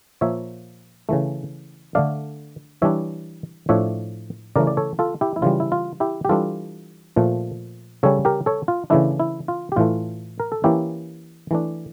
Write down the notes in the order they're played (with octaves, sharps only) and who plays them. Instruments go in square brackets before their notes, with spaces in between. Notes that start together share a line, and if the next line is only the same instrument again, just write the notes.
[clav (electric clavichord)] A#2 F3 A#3 C#5 E5
C#3 E3 A3
D3 A3 D4 D5 F5
E3 G3 D4 C#5 E5
A2 F3 A3 D4 C#5 E5
C#3 E3 A3 A#4 D5
D5
A4 C#5
F4 A4
E4 G4
E4
C#3 E3 G3 F4
E4
F4
E4 G4
G4
E3 G3 D4 F4 A4
A#2 F3 A3
C#3 G3 C#4 A4 C#5
G4 A#4
A4 C#5
F4
C#3 E3 A3 D4 E4
E4
F4
G4
A2 E3 A3 F4
A#4
A4
E3 A#3 C#4 E4 G4
E3 A3 D4